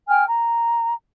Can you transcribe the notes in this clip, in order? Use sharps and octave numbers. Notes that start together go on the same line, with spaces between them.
G5 G#5 F6
A#5